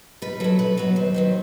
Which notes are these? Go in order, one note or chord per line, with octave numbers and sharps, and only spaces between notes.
B2 B4
F#3 B3 A4
B2 B4
F#3 B3
D#2 C5
D#3 F#3 B3